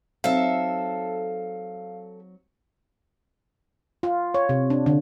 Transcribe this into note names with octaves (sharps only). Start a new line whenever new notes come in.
F#3 C4 D#4 A4 E5 F5
F4
C#5
C3
D4
D3